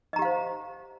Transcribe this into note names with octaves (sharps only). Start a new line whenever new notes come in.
G4 C5 D#5 F5 A#5